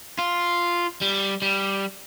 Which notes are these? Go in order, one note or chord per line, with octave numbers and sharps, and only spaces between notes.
F4
G3
G3